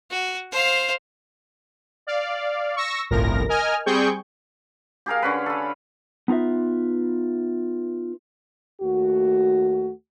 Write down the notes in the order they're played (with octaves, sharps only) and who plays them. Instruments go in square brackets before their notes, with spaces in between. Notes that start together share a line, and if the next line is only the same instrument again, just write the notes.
[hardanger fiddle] F#4
C5 F5
[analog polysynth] D5 F5
C#6 E6 A#6
G1 C2 A2 F3 A#4 A#6
A#4 D#5 G#5 F6
G3 C4 G#4 G5 C#6 G6
[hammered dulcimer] G4 G#4 A#4 F5
D3 C#4 B4
A4 B5
[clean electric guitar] B3 D#4 F4 B4 E5
[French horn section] D#2 A3 F#4